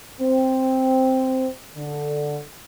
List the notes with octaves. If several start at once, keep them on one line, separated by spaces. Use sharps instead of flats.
C4
D3